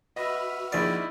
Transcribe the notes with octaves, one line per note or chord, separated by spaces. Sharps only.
F#4 B4 D#5 E5 B5 F6 A#6
A#1 D#4 E4 G#4 D5 D7